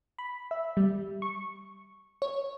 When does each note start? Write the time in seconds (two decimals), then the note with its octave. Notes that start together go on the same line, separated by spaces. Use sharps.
0.19 B5
0.51 E5
0.77 G3
1.22 C#6
2.22 C#5